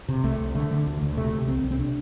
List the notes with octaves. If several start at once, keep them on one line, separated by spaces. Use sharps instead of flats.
C3
C2 A3
C2
D3 A3
D3
D2
D2
C3 A3
C3
C2 C4
C2
C4
C3 D4